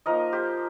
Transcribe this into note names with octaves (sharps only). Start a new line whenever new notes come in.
F3 A#3 D#4 A#4 D#5
G4 C5